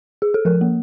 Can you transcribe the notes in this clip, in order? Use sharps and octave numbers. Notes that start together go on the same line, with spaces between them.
G#4
A4
F3 A#4
A#3